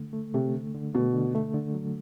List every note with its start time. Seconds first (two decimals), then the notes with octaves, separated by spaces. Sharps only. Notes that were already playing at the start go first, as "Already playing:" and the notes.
Already playing: D3 A3
0.13 A3
0.34 C3 A3
0.54 D3
0.74 D3
0.93 B2 A3
1.13 D3
1.35 A3
1.54 D3
1.74 F#3